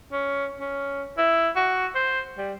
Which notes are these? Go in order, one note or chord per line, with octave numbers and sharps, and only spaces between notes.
C#4
C#4
E4
F#4
C5
G3